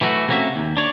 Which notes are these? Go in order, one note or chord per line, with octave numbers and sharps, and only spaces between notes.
E3 F#3 A3 F#4
C3 A3 A#3 C#4 F#4 E5
D#2
D4 C#5 D5